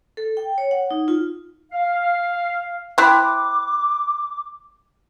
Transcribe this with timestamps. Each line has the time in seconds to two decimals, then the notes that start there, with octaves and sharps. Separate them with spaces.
0.17 A4
0.37 G5
0.58 C#5
0.71 F#5
0.91 D#4
1.08 F4
1.72 F5
2.98 C4 E4 B5 D6 F#6